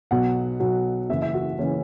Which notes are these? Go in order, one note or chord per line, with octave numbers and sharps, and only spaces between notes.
B1 B2 F#3 F#5
B1 B2 F#3
F#1 F#2 E3 E5
E5
F#4
F#1 E3 C#4